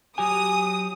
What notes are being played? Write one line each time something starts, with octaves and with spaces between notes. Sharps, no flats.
F#3 G4 G#5 D#6